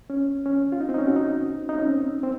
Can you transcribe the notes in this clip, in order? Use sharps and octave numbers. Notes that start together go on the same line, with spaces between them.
C#4
C#4
F4
D#4
C4
D#4
C#4
F#4
D#4
D#4
C#4
C4
C4